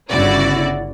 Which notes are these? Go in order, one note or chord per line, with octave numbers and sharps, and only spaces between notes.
G1 C#3 E4 F#4 D5